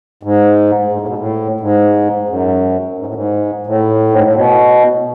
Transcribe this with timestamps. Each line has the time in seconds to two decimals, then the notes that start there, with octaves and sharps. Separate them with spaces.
0.23 G#2
0.92 G#2
1.01 A2
1.08 B2
1.18 A2
1.60 G#2
2.29 F#2
2.98 G#2
3.06 A2
3.14 G#2
3.67 A2
4.10 G#2
4.23 A2
4.35 B2